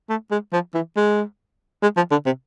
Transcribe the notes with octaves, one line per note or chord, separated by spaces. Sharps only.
A3
G#3
F3
E3
G#3
G#3
F3
D3
C3